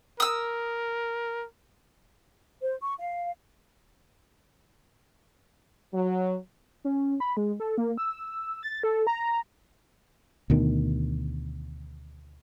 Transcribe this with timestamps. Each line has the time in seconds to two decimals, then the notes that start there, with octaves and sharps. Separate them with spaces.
0.20 A#4 D#6 E6
2.62 C5
2.80 C#6
2.99 F5
5.94 F#3
6.85 C#4
7.20 B5
7.37 G#3
7.60 A4
7.78 A#3
7.98 E6
8.63 A6
8.83 A4
9.07 A#5
10.50 D2 B2 D#3